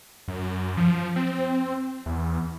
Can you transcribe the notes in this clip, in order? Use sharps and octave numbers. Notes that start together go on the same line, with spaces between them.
F#2
F3
C4
E2